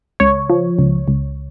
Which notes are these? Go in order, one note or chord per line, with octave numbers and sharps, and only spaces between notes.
C#2 C#5
F3
C#2
C#2